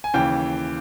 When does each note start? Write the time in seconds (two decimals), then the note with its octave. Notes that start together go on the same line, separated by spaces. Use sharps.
0.04 G#5
0.14 D#2 C#3 E3 G5